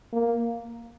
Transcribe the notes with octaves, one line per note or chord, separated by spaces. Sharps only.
A#3